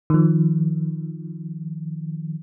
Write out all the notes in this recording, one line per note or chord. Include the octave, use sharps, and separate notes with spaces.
D#3 F3